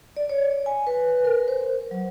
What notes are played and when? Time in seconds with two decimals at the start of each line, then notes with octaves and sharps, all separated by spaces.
0.17 D5
0.29 C#5
0.66 G#5
0.87 B4
1.25 A#4
1.48 C5
1.91 F#3